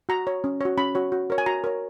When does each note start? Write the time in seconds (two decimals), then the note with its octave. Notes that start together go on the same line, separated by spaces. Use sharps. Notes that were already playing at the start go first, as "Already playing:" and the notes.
0.09 F#4 A#5
0.27 C#5
0.44 C#4
0.61 F#4 C#5
0.78 C#4 B5
0.95 F#4 C#5
1.12 F#4
1.30 A#4 C#5
1.38 G#5
1.46 F#4 A#5
1.64 A#4 C#5